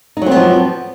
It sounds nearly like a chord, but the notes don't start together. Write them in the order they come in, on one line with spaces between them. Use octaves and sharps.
D#4 F#3 C4 B3 F3